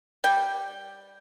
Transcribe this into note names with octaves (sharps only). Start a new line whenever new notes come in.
G3 G5